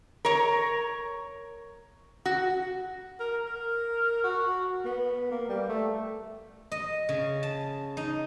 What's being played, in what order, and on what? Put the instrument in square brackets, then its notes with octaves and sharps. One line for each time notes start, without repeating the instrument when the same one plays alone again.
[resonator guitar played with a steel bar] A#4 C#5
F#4
[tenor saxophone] A#4
A#4
F#4
B3
A#3
G3
A3
[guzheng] D#5
C#3
A5
D#4